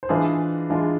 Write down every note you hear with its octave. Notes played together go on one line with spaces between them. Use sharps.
C5
E3 G#3 D4 F4 G#4 B4
E3 G#3 D4 F4